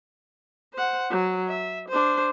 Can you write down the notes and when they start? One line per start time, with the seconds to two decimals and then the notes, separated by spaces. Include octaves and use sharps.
0.73 C5 F#5
1.10 F#3
1.48 E5
1.88 D4 C5